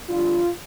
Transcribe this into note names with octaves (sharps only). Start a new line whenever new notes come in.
F2 D3 G3 D4 F4